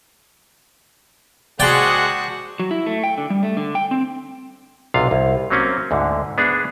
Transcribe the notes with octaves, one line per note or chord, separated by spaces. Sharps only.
G#3 F#4 G#4 C5 D5 F#5 G5 A5
F#3
E4
A3
G5
D3
G3
A3
D3
G5
C4
B1 C3 F4 F5
C2
F#3 A#3 C4 C#4
D2 G#2 D3
B3 D4 G#4